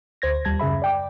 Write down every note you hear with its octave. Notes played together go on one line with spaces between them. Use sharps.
D2 C5 G#6 A#6
D#2 G3 A5 G#6 A#6
F#2 C#3 G#4 E5 B5
D5 G5 D6